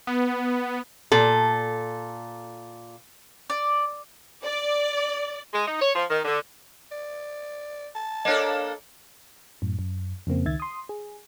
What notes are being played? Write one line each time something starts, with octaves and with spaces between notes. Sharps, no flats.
B3
A#2 A4
D5
D5
G#3
D#4
C#5
F3
D#3
D3
D5
A5
A#3 D4 A4 C#5 D#5
F#2 A2
F#2
F2 C#3 A#3 C4
C#2 D#3 E5 G#6 A6
C6 D#6
G#4